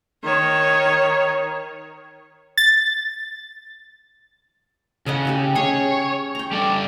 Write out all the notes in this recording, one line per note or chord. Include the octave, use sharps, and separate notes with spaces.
D#3 C#5
A6
C#3 A4 D#5 F#5
G4 A4 G#5
C#4 G#4 C#5 A#5
G5 A#5
G3 A4 D5